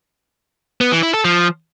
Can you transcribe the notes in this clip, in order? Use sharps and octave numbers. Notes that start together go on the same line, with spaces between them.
B3
E3
E4
A4
F3